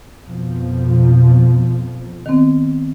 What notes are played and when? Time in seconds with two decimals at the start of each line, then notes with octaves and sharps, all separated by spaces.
0.25 F2 B2 F3
2.26 D#3 B3 C4